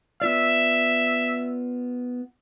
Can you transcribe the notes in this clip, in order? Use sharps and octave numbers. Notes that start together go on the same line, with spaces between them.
B3 F4 D5 E5